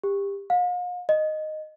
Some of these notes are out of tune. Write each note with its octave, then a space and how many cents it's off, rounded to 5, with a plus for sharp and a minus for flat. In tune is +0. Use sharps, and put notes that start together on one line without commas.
G4 +25
F5 +45
D#5 -5